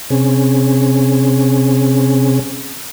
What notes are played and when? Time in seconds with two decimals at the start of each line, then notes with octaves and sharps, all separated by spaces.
0.10 C3 C4 C#4 G#4